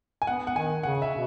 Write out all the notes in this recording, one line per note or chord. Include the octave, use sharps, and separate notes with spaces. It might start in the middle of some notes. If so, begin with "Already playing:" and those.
G#5
B3 F#5
F#5
D#3 G#5
C#3 F#5
E5
B2